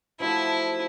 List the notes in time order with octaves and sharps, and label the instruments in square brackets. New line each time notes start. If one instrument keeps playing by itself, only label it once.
[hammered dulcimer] F3 F#3 A3 [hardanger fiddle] E4